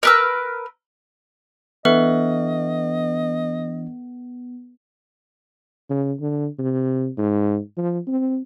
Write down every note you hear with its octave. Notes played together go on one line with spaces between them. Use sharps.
A#4 B4 E6
E3 B3 D4 A4 B4 D#5 E5
C#3
D3
C3
G#2
F3
C4